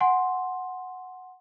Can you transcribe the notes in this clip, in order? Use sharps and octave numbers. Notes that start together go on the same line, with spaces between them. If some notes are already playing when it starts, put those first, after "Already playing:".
F#5 G#5 C6